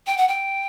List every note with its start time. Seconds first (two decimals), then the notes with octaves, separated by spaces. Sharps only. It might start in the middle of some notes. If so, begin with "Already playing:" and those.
0.07 G5
0.18 F#5
0.28 G5